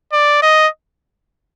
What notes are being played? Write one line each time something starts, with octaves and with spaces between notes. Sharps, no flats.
D5
D#5